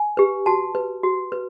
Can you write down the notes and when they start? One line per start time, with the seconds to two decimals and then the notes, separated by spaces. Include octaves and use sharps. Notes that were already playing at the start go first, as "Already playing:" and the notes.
Already playing: G#5
0.17 G4 B4
0.46 F#4 A5
0.75 B4
1.04 F#4
1.32 B4